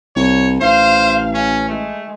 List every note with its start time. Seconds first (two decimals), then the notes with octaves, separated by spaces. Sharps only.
0.16 C2 C#5
0.61 A1 C5 F5
1.34 C#4
1.69 G#3 A3